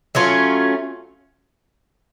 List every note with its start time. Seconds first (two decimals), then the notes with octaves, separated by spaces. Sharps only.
0.15 F#3 A3 C#4 F4